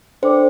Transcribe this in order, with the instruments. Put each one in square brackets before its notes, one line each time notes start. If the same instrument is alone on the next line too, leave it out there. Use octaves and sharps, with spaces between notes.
[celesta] D4 A4 D5 G5 D6 [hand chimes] C5